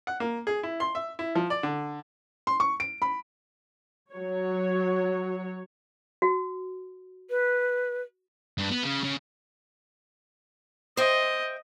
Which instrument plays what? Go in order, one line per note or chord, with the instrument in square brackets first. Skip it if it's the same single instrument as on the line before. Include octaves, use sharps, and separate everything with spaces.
[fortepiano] F#5
A#3
G#4
E4
C6
E5
E4
F3
D5
D3
[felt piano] C6
C#6
D7
B5
[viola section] F#3 C#5
[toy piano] F#4
[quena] B4
[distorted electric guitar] G2
B3
C#3
C#3
[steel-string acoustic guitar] C5 E5 G5 [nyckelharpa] D#5